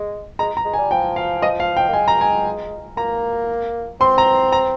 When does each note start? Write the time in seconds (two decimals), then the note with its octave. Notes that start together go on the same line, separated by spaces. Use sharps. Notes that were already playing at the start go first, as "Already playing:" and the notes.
Already playing: G#3
0.39 G#3 A#5
0.57 A#5
0.65 G#3
0.74 G#5
0.78 G3
0.91 F3 G5
1.16 F5
1.42 D#5
1.60 F5
1.77 G5
1.89 A#3
1.93 G#3 G#5
2.08 A#5
2.21 G#5
2.97 A#3 A#5
4.01 C4 C6
4.18 A#5
4.52 A#5